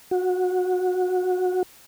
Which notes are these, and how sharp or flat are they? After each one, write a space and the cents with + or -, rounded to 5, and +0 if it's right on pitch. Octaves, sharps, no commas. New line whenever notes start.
F#4 -20